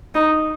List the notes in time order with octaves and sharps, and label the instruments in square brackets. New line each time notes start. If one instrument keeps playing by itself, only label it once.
[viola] D#4